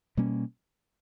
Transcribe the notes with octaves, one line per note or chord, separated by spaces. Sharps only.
B2 G3 A#3 C#4